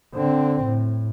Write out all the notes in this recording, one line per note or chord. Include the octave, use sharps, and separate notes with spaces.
D3 C4
A2